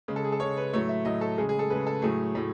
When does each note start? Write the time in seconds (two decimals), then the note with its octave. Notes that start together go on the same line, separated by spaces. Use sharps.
0.08 C#3 G#3
0.16 A4
0.24 G#4
0.32 A4
0.40 C#3 G#3 C#5
0.57 B4
0.73 A2 F#3 A3 C#5
0.89 E5
1.05 A2 F#3 A3 D#5
1.21 A4
1.38 C#3 G#3 G#4
1.49 G#4
1.59 A4
1.70 C#3 G#3 B4
1.87 A4
2.02 A2 F#3 A3 G#4
2.35 A2 F#3 A3